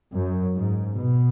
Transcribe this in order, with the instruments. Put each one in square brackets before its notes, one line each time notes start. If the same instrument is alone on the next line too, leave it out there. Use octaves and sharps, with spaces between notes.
[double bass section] F#2
G#2
B2